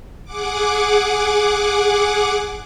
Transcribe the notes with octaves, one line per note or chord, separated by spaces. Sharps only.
G#4 F#5 D6